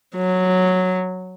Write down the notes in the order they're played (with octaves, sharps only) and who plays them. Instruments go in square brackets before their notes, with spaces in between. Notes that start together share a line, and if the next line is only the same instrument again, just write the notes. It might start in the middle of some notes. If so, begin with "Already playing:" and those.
[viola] F#3